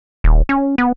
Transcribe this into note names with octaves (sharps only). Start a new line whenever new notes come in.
D#1
C#4
B3